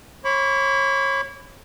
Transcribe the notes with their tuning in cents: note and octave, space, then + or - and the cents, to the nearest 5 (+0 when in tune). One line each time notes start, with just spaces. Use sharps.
C#5 -30 B5 +15 D6 -45